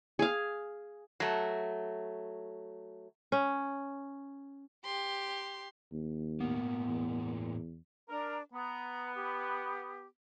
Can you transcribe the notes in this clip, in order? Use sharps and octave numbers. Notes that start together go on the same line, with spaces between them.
G#4 F5
F#3 A3
C#4
G4 C6
D#2
A2 A#3 B3
E2
D4 A#4
B3 A#5
G4